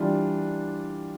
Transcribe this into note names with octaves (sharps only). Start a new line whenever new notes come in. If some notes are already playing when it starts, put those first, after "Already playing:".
Already playing: E3 G3 D4 F4